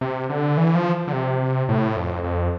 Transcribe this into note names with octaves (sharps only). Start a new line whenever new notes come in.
C3
D3
E3
F3
D3
C3
A2
F2
F2